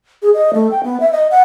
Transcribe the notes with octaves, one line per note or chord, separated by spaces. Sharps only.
G#4
D#5
A3
G5
B3
E5
D#5
F#5